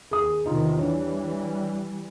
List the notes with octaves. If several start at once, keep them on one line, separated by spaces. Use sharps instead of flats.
D#2 G#4 D#6
E2 C3 D#3 D#4 F4
E3 G3 D4 C#5